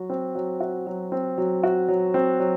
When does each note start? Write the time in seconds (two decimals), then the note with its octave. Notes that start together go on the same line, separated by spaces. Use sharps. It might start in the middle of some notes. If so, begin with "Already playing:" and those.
Already playing: F#3 F#4
0.10 C4
0.35 F#3
0.60 F#4
0.87 F#3
1.12 C4
1.38 F#3
1.63 F#4
1.88 F#3
2.14 C4
2.40 F#3